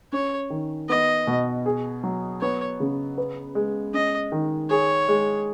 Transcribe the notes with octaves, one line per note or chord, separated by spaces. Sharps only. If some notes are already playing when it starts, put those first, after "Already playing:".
C#4 C#5
D#3
B3 D#5
B2
G#4
F#3
B3 C#5
C#3
B4
G#3
C#4 D#5
D#3
G#4 C#5
G#3